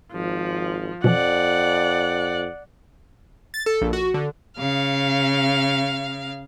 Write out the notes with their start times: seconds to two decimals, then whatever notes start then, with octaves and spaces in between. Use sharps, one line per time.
0.13 G#1 F3
1.04 F2 B2 E3 F3 D5 F#5
3.54 A6
3.66 A4
3.82 A#1
3.93 F#4
4.14 D3
4.57 C#3 F5